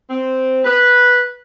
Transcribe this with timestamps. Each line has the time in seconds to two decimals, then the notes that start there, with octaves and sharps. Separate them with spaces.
0.10 C4
0.65 B4